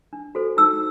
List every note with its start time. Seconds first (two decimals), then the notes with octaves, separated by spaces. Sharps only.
0.13 D4
0.35 F#4 A4 C5
0.57 D#4 E6